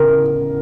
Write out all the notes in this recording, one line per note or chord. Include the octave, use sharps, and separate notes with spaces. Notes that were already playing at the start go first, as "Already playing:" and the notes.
Already playing: C#3 A#4